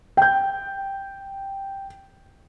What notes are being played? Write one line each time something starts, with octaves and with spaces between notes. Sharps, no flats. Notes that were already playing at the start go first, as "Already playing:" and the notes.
G5 G6